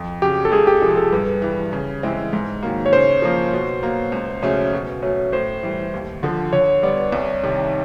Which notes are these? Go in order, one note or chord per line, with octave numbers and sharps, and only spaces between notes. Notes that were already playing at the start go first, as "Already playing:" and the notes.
Already playing: F2
C#3 F#3 G4
A4
C#2 G#4
G4
C3 F3 G#4
A4
G2 B4
E3 G3
C#3
E3 G#3 C4 E4
G#2
D#3 F#3 A#3
C#5
C#3 C5
F3 A#3
B2
F#3 A#3
C#2
C#3 F#3 A3 C#4
B2
F#3 A3 C#4
A2 C5
E3 G3
D#2
D3 F3
D3 C#5
G3 B3 D5
C2
C3 D#3